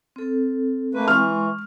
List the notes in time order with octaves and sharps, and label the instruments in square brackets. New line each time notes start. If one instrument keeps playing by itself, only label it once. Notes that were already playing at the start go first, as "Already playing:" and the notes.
[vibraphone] C4 A4
[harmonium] A3 A#3 B4 [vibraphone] C4
[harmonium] E3 [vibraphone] G#3 C6 C#6 [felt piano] F6